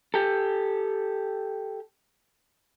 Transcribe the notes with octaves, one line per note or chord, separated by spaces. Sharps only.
G4 A4